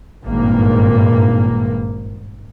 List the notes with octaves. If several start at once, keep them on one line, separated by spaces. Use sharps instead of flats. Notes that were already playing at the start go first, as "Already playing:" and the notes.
G#1 G2 A#2 A#3